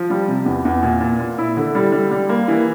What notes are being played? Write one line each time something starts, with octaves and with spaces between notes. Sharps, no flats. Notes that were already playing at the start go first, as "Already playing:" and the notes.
Already playing: F3
G3
C3
E2
E2
A#2
A#2
A#2
E4
D3
G3
G3
G3
A#3
E3